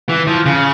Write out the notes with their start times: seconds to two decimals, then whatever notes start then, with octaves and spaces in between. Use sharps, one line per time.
0.09 E3
0.27 F3
0.46 C#3